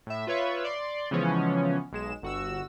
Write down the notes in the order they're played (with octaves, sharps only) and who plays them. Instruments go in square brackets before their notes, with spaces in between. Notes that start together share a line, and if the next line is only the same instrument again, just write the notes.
[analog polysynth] A2 E5
F4 B4 C#5 E5
D5 C6
C#3 E3 F3 G#3 B3 C#4
B1 G#3 E7
G1 F#4 E6